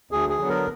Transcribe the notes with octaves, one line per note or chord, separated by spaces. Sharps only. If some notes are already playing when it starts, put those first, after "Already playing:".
D2 G#4
G#4
D3 F#3 B3
A#4